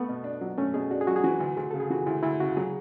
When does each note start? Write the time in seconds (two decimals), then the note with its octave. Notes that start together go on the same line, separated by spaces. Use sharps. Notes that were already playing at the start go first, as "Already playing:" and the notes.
Already playing: A3 B3
0.09 B2
0.24 D4
0.41 F#3
0.58 A3 C#4
0.74 B2 G#4
0.91 D4 F#4
1.01 G#4
1.07 F#3 F#4
1.16 G#4
1.24 E3 F#4
1.40 D2
1.57 D2 G#4
1.71 C#3 A4
1.80 G#4
1.90 E3 F#4
2.06 D2 E4
2.23 D2 E4
2.40 C#3 F#4
2.57 F#3 G#4